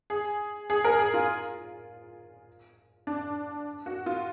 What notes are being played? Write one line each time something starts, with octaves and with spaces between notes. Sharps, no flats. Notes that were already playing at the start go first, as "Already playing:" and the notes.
G#4
G#4
A#4
G#4
F4
D4
F#4
F4